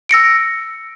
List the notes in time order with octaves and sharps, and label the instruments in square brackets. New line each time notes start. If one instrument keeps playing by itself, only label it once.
[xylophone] E6 A#6 C#7 D7